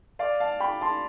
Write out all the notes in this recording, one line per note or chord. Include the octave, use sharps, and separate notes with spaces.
D5 F5
F5 A5
G5 B5
A5 C6